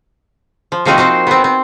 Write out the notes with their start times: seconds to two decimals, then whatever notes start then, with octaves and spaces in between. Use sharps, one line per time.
0.72 F3
0.85 C3 F3 A#3 C4 D#4 F#4
0.98 A#3 C4 C5
1.27 B3 C4
1.44 C4